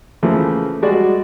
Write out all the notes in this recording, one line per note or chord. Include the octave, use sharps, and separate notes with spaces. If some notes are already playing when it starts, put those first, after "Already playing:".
C#3 E3 F3 A3 A#3
G3 G#3 F#4 D5